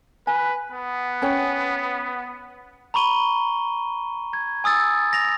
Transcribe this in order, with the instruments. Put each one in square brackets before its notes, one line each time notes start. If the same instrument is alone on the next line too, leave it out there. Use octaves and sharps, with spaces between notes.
[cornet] B4 [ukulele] G#5
[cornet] B3
[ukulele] C#4 C#5 G5
[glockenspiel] A#5 B5 C#6 D#7 G7
G#6
G#5 D#6 E6 A6
A#6 F7